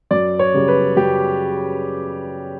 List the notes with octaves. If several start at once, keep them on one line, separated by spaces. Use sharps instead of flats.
F#2 D5
C#5
C#3 G3
B4
F#2 G4